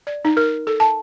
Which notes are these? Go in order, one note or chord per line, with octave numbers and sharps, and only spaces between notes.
D5
D#4
A#4
A4
A5